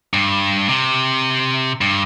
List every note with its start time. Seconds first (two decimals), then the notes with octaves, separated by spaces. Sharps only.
0.14 G2
0.68 C3
1.81 G2